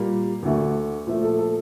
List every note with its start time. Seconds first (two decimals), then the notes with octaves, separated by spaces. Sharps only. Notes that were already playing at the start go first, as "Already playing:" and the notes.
Already playing: A#2 G3 A#3
0.43 D2 D3 A3
1.07 A#2 F3 A3
1.23 A4
1.39 A4